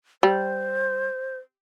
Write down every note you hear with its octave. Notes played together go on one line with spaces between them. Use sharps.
G3 C5